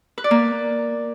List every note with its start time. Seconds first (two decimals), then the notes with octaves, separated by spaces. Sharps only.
0.18 B4
0.24 D5
0.31 A#3